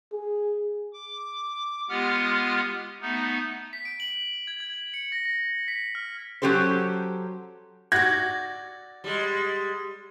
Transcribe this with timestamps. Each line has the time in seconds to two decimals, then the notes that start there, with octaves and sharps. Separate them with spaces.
0.13 G#4
0.93 D6
1.89 G#3 B3 F4 G4 F#5 F6
3.01 A3 B3 D#4
3.73 B6
3.85 D7
4.00 F#7
4.47 G#6
4.60 G#6
4.94 C#7
5.12 A#6
5.25 A#6
5.68 B6
5.95 F6
6.42 F#3 C#4 G4 A4 C5
7.92 F#4 D5 G#6 A#6
9.04 G3 G#3